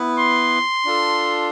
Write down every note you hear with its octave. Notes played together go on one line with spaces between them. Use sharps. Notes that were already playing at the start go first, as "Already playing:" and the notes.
Already playing: B3 E4 B4
C6
D4 F4 A4